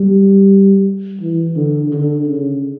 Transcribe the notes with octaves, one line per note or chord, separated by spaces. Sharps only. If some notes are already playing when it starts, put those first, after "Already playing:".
Already playing: G3
E3
D3
D3
C#3